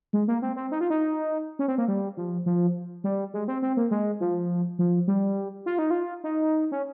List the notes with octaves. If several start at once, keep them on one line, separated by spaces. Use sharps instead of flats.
G#3
A#3
C4
C4
D#4
F4
D#4
C#4
C4
A#3
G3
F3
F3
G3
G#3
C4
C4
A#3
G#3
F3
F3
G3
F4
D#4
F4
D#4
C#4